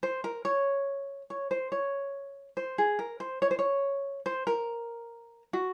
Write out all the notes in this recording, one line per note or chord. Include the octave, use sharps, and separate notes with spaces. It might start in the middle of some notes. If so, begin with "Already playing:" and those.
C5
A#4
C#5
C#5
C5
C#5
C5
G#4
A#4
C5
C#5
C5
C#5
C5
A#4
F#4